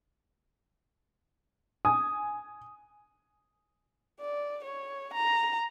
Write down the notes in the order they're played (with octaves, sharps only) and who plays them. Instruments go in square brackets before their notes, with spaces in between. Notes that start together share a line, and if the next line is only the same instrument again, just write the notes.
[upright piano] G#5 [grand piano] D#6
[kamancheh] D5
C#5
A#5